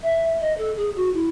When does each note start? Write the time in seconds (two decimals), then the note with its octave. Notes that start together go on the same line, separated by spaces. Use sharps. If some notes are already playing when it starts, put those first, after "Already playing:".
0.02 E5
0.40 D#5
0.58 A4
0.77 G#4
0.95 F#4
1.13 E4